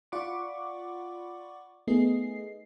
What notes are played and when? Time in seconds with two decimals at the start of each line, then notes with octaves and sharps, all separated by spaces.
0.12 F4 D5 F#5 B5 C#6 D6
1.87 A3 B3 D#4 G#4 D#5 C7